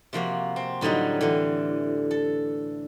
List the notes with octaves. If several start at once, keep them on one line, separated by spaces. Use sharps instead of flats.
C3 F3 A#3 F#4
C4
A2 D3 F#3 G3 D#4
D3 E3
A4